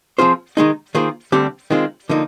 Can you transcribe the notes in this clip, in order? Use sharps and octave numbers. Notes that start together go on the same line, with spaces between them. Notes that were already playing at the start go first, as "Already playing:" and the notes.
F3 C4 F4 G#4 C5
D#3 G#3 D#4
D#3 A#3 F4 G#4 C5
D2 D3 G3 C4 G4
D#3 G#3 C4 F4
D3 F3 A#3 D#4